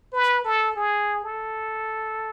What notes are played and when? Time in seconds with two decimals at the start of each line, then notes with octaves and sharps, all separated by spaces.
0.13 B4
0.45 A4
0.76 G#4
1.24 A4